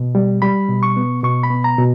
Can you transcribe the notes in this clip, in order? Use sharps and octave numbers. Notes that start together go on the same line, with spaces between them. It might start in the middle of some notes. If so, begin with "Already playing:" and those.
Already playing: B2
G3
G3 B5
B2
C#6
B3
B2 C#6
B5
B3
A#5
B2